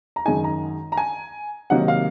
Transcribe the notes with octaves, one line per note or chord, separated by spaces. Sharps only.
A#5
F#2 D#3 G#3 D#4 G#5
A#5
A#5
G#5
C3 D#3 F#3 A#3 D#4 F#5
F5